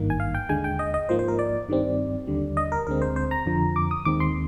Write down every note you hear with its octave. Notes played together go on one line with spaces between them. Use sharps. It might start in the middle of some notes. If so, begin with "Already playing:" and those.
Already playing: G#1 G2 D#3 A#3
G#5
F5
G5
D#2 D3 G#3 G#5
G5
D#5
D#5
G#2 F3 A#3 C5
C5
A#4
D5
G2 D#3 G3 C4
D#2 D3 G3
D#5
A#4
D2 D3 G#3 C4 A#4
C5
C5
A#5
F2 D3 F3
D6
D#6
D#2 D#3 G#3 C4 D6
C6